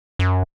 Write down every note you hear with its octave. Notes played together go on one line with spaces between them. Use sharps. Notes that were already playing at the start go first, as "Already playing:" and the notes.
F#2